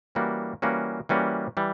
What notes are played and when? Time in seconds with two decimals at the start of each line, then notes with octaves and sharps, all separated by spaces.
0.15 E3 G3 A#3 C#4 F#4
0.62 E3 G3 A#3 C#4 F#4
1.09 E3 G3 A#3 C#4 F#4
1.57 E3 G3